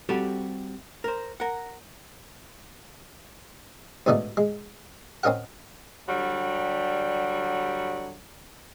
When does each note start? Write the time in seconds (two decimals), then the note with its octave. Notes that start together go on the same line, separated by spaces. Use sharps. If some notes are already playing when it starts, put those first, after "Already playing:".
0.09 G3 C4 F#4 G4 A4
1.04 A#4 C5
1.40 A#4 F#5
4.06 G#2 B2 D3 A3 D#4
4.37 G#3
5.23 C4 C#4 D#4 A#4 F#5
6.07 D3 F#3 G3